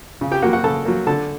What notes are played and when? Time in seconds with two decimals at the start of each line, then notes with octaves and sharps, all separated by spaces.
0.21 C#3
0.32 G4 G5
0.42 F#3 A#3 F#4 F#5
0.53 F#4 F#5
0.64 C#3 A4 A5
0.85 F#3 A#3
1.07 D3 A4 A5